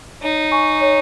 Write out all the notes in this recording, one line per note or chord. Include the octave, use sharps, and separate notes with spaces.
D#4 C#5
G#5 C#6
C#5